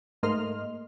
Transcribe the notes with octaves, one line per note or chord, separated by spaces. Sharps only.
G#2 A3 A#3 D#5 C6 F6